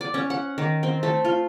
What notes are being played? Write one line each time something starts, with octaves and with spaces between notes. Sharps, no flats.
D5
C#4
F#5
D#3
C4
A3
F4